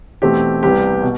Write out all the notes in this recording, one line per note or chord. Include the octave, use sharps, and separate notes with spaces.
E2 B2 A3 C4 G4
C2 C3 G3 B3 G4
B2